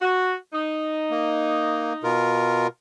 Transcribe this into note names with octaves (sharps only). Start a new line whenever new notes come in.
F#4
D#4
A#3
B2 F4 A#4